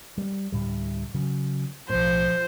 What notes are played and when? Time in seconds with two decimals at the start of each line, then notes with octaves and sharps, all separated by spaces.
0.18 G3
0.52 D2 A2 G3
1.14 C#3 F#3
1.89 B1 A2 F3 C5